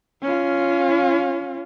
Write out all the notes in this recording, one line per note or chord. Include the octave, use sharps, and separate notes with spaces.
C#4 F4